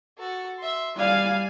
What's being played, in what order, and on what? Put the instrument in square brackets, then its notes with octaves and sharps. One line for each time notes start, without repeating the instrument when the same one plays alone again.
[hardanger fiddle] F#4 A4
E5 C6
[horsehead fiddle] G3 F5 [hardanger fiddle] D5 G#5